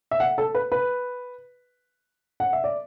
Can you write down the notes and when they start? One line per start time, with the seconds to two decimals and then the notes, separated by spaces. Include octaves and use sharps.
0.11 E5
0.20 F#5
0.38 A4
0.55 B4
0.72 B4
2.40 F#5
2.53 E5
2.64 D5